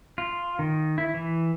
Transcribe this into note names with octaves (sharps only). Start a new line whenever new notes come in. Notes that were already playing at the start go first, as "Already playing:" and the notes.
F4
D#3
E4
E3